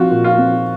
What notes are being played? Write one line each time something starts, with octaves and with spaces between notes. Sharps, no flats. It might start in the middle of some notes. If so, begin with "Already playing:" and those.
Already playing: F3 C4 F4 F#4
A#2
F4
C4